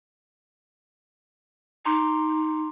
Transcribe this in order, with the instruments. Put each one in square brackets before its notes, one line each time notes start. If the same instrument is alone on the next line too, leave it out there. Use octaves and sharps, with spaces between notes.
[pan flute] D#4 [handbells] A#5 C6 D6